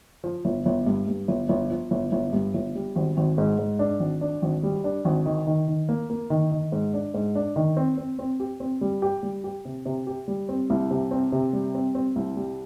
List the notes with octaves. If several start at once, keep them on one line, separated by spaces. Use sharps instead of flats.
F3
G1
G1
G2
G2
G1
G1
F3
G1
G1
G2
G1
G3
G#1
G#1
G#2
G#2
D4
G#1
D4
G#1
G3
D4
G#1
D#3
D#3
D#3
A#3
A#3
D#3
D#3
G#2
D4
G#2
D4
D#3
C4
C4
C4
G4
C4
G3
G4
G3
G4
C3
C3
G4
G3
C4
C2
C3
C4
C3
G3
C4
C4
C2
G3